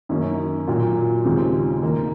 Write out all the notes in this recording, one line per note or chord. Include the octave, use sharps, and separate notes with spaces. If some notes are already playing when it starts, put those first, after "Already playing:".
F#2 D#3 A#3 C#4
A#2 F#3 A#3 F4
D#2 C#3 G#3 C4 F4
F2 D#3 A#3